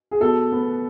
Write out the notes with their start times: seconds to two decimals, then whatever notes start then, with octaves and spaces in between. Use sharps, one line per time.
0.11 G#4
0.20 B2 A4
0.52 B3